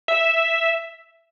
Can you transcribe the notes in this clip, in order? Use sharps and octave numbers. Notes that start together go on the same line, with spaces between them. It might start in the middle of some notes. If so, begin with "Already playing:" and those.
E5